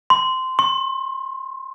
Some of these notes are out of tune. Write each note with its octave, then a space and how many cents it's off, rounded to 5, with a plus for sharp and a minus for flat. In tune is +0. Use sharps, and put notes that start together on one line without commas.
C6 -15
C6 +45